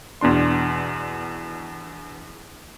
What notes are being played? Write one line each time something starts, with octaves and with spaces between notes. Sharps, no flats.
E2 B2 D4 C6